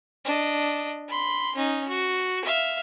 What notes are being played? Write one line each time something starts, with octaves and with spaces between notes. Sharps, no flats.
D4 D#5
B5 C6
C#4 D#4
F#4
E5 F5